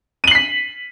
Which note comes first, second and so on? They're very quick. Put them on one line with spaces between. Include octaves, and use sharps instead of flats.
D#7 F#7 C7 B6